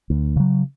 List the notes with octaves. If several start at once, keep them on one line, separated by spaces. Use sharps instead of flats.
D2
C#3 F#3